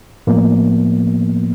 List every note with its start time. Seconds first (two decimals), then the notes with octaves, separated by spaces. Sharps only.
0.27 A2 F3 A#3 B3